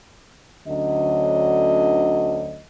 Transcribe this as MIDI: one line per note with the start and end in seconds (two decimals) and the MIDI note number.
0.67 2.61 38
0.67 2.61 50
0.67 2.61 54
0.67 2.61 61
0.67 2.61 75